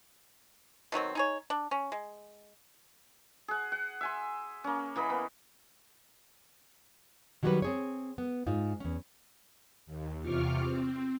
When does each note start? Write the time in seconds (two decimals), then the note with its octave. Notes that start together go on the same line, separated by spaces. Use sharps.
0.92 B2 D#3 F#3 C4
1.15 D#4 G#4 C#5
1.50 D4
1.71 C#4
1.92 G#3
3.48 G#4 F#5
3.72 F#5
4.01 E5 G#5 C6
4.64 A#3 C#4
4.96 E3 A#3 D#5 B5
5.10 B3
7.43 D#3 F#3 G3 E4 F#4 B4
7.62 C4 G#4 C#5
8.18 B3
8.47 G#2 D#4 F4
8.80 E2 C#4
9.86 D#2
10.22 E2 C3 F4 C#6 D6 F6
10.58 C4